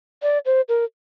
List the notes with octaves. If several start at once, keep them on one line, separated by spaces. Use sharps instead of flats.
D5
C5
A#4